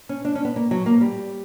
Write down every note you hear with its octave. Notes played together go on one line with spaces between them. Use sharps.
C#4
D4
C#4
B3
A#3
F#3
A#3
G3